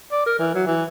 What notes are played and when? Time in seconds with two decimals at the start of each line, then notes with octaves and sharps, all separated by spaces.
0.11 D5
0.26 A#4
0.39 E3
0.54 F#3
0.67 E3